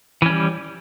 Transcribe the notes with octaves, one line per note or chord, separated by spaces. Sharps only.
E3 G3 C#4